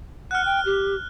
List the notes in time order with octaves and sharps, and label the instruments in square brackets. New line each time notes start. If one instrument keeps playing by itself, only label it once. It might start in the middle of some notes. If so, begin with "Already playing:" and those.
[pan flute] F#5 [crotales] F6 F#6
[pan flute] G5
G4